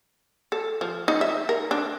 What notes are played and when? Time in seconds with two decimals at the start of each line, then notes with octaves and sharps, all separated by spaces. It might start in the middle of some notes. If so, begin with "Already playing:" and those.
0.52 A4
0.81 F3
1.08 D#4
1.21 E5
1.49 A#4
1.71 D4